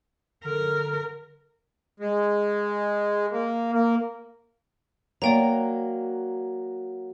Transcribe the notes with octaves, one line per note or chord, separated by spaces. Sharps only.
D3 A#4 F6
G#3
A#3
A#3
F#3 A#3 D5 G5 A#5